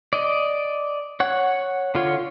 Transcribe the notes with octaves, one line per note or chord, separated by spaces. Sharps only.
D5 D#5
C#5 F#5
D3 F4 C#5